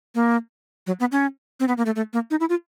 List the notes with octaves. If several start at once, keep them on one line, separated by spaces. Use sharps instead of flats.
A#3
F#3
B3
C#4
C4
B3
A#3
A3
A3
A#3
D#4
E4
F4